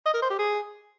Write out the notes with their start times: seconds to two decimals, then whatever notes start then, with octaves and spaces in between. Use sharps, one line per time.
0.06 D#5
0.14 A#4
0.22 C5
0.31 G4
0.39 G#4